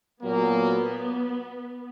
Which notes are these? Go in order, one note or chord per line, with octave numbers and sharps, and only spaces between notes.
A#2 F#3 A#3 B3